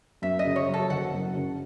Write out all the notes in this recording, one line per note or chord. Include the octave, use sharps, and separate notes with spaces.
F#2 E5
D#5
C#3
C#5
F#3
A4
F#1 F#5
F#2
C#3